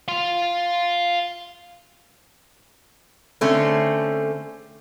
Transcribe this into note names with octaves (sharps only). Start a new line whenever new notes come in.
F5 C6
D3 A3 C4 C#4